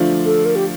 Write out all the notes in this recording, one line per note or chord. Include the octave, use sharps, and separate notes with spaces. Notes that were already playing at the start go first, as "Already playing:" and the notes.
Already playing: D3 F3 A3 D4 F4
A4
A#4
G4